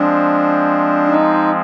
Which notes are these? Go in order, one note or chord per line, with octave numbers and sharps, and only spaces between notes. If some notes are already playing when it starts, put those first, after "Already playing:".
Already playing: F3 G#3 C4 D4
D#4